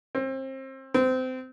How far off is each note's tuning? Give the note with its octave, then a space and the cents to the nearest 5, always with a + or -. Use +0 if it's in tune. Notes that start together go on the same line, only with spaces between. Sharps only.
C4 +30
C4 -25